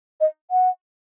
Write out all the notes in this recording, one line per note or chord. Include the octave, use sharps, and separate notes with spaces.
D#5
F#5